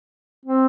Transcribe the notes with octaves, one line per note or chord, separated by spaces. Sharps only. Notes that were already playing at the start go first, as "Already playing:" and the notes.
C4